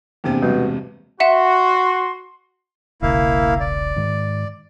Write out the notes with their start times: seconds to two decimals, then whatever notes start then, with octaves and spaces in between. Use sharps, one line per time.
0.24 E2 G2 C3 A#3 B3 C5
0.42 B2 G3 G#3
1.20 F#4 E5 F#5 C6 E7
3.02 E1 B1 C#3 A#3 E4 F5
3.60 D5
3.96 G#2 D#3